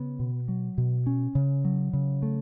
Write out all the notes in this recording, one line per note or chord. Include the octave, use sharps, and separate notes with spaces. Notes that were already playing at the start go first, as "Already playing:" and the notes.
Already playing: C#3 B3
B2
F#3
B2
C#4
C#3
F#3
C#3
A3